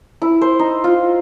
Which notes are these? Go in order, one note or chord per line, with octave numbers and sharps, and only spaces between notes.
E4
C5
D#4
F4